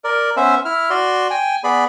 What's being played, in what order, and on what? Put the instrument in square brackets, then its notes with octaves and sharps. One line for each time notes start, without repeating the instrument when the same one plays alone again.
[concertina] A#4 D5
B3 C#4 C5 E5
E4 F6
F#4 D5 C6
G5 G#5
B3 G#4 D5 B5